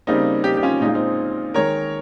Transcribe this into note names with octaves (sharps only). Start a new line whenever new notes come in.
C#3 G3 A#3 C4 D#4
D#4 G4
G4
C#4 F4
A#2 G#3 D#4 F4
C4 D#4
D#3 G#3 A#4 C#5